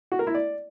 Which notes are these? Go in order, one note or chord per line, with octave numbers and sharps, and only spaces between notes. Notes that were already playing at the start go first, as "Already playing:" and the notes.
F#4
A#4
E4
D5